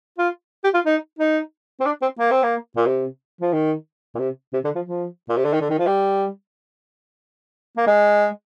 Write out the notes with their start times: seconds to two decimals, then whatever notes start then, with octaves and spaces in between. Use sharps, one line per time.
0.18 F4
0.64 G4
0.74 F4
0.86 D#4
1.19 D#4
1.80 C4
1.86 D4
2.02 C4
2.19 A#3
2.31 C4
2.43 A#3
2.76 A#2
2.86 C3
3.41 F3
3.53 D#3
4.15 A#2
4.19 C3
4.53 C3
4.64 D3
4.75 F3
4.86 F3
5.29 A#2
5.37 C3
5.45 D3
5.53 D#3
5.61 D3
5.70 D#3
5.79 F3
5.87 G3
7.77 A#3
7.87 G#3